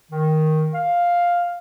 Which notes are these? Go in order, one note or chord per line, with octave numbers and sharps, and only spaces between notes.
D#3
F5